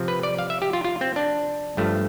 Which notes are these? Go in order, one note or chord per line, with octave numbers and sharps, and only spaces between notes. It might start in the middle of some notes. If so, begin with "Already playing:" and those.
Already playing: C3 F3 C4
B4
D5
F5
E5
G4
F4
F4
C4
D4
G2 F3 A3